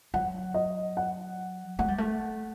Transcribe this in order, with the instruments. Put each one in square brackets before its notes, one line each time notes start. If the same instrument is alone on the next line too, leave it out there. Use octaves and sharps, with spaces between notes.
[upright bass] F#3 [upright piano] F#5
[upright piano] D#5
F#5
[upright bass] A3 [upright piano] F#5
[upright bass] G3
A3